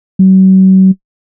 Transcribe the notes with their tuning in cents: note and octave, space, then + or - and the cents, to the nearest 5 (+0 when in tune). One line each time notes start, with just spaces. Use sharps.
F#3 +40